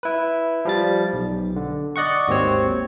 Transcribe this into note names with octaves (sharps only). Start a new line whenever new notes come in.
E4 B4
F3 G3 A6
B1
D3
D5 D#5 F#5 C#6
G#1 D#2 C4 C#5